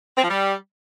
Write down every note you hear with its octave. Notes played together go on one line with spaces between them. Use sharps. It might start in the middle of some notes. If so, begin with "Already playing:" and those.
C4
F3
G3